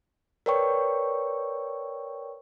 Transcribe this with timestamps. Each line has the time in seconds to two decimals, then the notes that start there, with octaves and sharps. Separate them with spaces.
0.46 A#4 B4 C#5 D5 G5 C#6